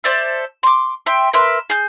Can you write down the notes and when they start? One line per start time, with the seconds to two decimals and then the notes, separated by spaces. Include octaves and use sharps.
0.04 A4 C5 D5 E5
0.63 C6 D6
1.06 E5 G5 C6
1.33 A#4 B4 E5 C6
1.70 G#4 G6